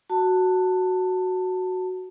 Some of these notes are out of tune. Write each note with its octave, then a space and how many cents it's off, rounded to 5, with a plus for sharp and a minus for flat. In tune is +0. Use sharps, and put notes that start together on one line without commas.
F#4 +0 A5 +20